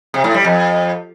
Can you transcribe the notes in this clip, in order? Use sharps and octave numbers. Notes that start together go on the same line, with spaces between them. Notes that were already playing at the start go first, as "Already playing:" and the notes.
C3
A2
G3
F2